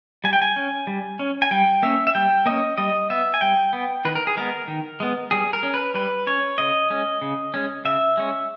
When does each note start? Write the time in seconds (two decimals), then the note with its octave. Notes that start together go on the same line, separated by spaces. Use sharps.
0.24 G3 G#5
0.33 G5
0.42 G#5
0.56 C#4
0.87 G3
1.19 C#4
1.42 G#5
1.51 G3 G5
1.83 A#3 C#4 E5
2.07 E5
2.15 G3 G5
2.46 A#3 C#4 D#5
2.78 G3 D#5
3.10 B3 E5
3.34 G#5
3.41 G3 G5
3.73 B3
4.05 D#3 B4
4.15 A#4
4.27 G#4
4.37 G#3 B3 A#4
4.68 D#3
5.00 G#3 B3
5.31 G3 G#4
5.53 A#4
5.63 C#4
5.74 B4
5.94 G3 B4
6.27 C#4 C#5
6.58 C#3 D#5
6.90 G#3 C#4
7.21 C#3
7.54 G#3 C#4
7.85 C#3 E5
8.17 G#3 C#4